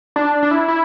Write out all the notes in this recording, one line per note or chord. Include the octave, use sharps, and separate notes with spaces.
D4
D4
E4
E4